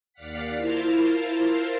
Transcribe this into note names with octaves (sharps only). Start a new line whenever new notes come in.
D#2 D5 F5 F#5 B6
E4 F4 A#4 C5 F5 A5